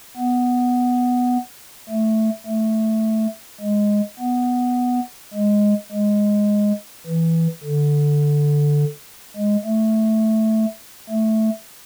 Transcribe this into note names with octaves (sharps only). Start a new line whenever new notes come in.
B3
A3
A3
G#3
B3
G#3
G#3
E3
D3
G#3
A3
A3